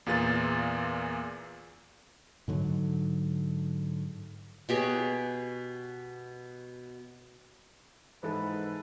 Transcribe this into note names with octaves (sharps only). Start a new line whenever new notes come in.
E2 A#2 F4 G#4 B4 A6
G#2 D3 F#3
B2 G4 G#4 C#5
G#2 E3 G#3 A4 B4